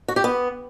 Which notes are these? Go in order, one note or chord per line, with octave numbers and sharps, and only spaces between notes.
F#4
G4
B3